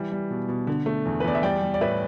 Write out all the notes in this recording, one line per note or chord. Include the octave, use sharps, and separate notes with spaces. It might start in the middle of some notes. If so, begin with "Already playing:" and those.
Already playing: E3 G3
G3
B2
B2
D3
A3
E2
B4
E2 D5
E5
G3 D5 G5
G3
D5
A2 B4 E5